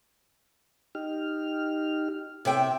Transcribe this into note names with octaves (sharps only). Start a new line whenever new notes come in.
D#4 G4 F6
C3 E5 G5